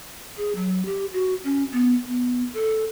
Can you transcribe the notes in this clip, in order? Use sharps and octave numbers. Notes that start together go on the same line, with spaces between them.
G#4
F#3
G4
F#4
C#4
B3
B3
A4